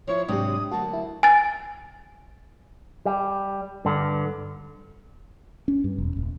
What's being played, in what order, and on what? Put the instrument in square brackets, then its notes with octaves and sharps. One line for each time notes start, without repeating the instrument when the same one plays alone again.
[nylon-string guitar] F3 E4 [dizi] C#5
[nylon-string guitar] G#2 C3 F#3 [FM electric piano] D4 G4 [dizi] D#6
[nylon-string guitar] D2 F#3 A#3 [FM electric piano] F#4 [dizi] A5
[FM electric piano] E4
[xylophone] G#5 A6
[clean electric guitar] G3
G2 D3
[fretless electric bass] C#4
G2
E1
D#1